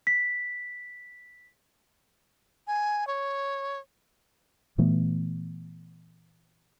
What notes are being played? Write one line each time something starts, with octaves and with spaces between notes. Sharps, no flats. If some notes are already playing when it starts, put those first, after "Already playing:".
B6
G#5
C#5
A#2 E3 A3 B3